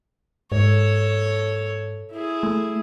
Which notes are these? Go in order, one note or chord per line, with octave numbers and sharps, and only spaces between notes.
G#2 A4 C#5
E4 G#4
A3